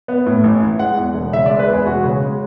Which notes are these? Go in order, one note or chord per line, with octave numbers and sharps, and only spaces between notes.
B3
A2
A1
E3
G#3 F#5
E2
E1
C#3 E5
D5
G#3
B4
E2 G#4
E1 F#4
C#3
G#3